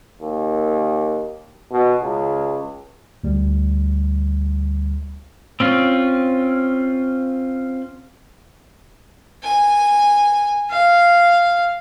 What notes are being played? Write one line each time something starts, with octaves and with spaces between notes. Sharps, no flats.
D#2
B2
C#2
D2 G3
C4 C#4 F4
G#5
F5